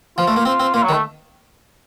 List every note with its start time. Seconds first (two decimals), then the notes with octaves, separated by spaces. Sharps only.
0.17 F3 F4
0.27 A3
0.36 A#3
0.45 C4 F4
0.60 C4
0.74 A#3 F4
0.83 F#3
0.89 D#3
0.93 A3